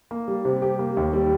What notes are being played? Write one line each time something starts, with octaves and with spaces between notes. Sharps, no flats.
A#3
G3
C3
G4
A#3
D#2
G3